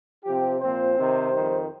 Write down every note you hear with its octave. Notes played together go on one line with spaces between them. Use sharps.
C3 F3 C4 G4
A#2 F3 C4 C5
C3 D#3 C4
F2 D#3 G3